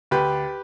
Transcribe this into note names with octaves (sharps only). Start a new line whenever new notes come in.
D2 G4 B4